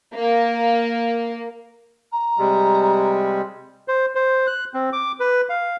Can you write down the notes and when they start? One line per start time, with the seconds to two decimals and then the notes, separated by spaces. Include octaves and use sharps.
0.14 A#3
2.12 A#5
2.39 C3 G3 G#3
3.88 C5
4.15 C5
4.47 F#6
4.74 C4
4.93 D6
5.20 B4
5.49 F5